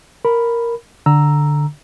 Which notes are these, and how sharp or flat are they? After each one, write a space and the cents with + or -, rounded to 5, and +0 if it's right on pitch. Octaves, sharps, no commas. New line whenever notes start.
A#4 +0 B5 +0
D3 +5 A#5 +0 E6 +0